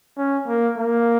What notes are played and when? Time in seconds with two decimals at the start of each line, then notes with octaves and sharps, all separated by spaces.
0.17 C#4
0.47 A#3
0.77 A#3